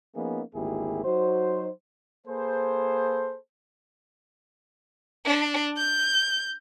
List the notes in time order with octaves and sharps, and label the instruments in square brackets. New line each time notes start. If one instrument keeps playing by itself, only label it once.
[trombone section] F3 A#3 B3 C#4 D#4 G#4
G#1 D2 A#3 E4 G4 G#4
F#3 D#4 F#4 C5
[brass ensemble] A#3 G#4 A4 B4 C5
[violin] D4
G6